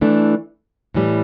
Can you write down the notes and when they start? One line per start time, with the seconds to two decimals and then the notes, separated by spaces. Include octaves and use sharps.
0.01 E3 A3 D4
0.94 A2 E3 G3